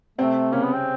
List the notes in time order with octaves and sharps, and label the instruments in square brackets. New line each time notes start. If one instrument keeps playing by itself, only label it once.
[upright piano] C3 C4 [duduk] A3
[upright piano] C#3 C#4 [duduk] A#3
[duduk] B3
C4